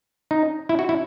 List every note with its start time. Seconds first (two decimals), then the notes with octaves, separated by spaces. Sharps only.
0.31 D#4
0.69 E4
0.79 F#4
0.89 E4